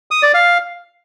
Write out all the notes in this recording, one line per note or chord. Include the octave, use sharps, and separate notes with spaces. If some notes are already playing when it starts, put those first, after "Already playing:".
D#6
D5
F5